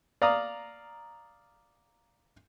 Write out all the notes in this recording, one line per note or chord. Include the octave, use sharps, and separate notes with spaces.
D5 F5 A#5 D#6